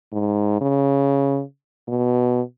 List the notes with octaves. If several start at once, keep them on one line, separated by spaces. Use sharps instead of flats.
G#2
C#3
B2